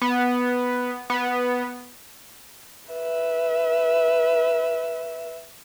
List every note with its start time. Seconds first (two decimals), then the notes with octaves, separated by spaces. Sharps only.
0.02 B3
1.10 B3
2.91 B4 E5